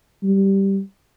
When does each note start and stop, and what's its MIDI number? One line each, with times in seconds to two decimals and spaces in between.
0.23 0.81 55